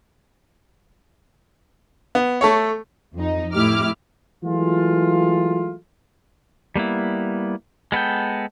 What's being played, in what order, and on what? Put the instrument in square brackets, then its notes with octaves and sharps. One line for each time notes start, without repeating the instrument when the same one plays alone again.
[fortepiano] B3
A3 A4 C#5
[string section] F2 D#4
A2 E4 G4 D6 F6
[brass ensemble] E3 F#3 G#3 A3 F4
[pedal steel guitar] G3 A#3 B3 E4
G#3 B3 A4 G5